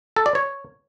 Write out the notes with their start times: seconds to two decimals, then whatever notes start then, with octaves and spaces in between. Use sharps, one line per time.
0.16 A4
0.26 D5
0.35 C#5